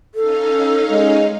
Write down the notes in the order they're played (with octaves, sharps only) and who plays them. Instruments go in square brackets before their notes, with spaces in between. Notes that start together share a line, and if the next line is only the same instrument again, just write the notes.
[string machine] C#4 D#4 F5 [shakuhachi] A4
[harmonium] G#3